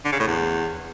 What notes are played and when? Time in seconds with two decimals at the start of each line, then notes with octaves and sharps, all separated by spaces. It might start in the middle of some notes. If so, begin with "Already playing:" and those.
0.05 D3
0.12 C#3
0.20 A2
0.27 E2